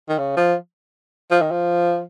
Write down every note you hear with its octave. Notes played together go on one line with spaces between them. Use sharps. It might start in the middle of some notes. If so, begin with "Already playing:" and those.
D#3
C#3
F3
F3
D#3
F3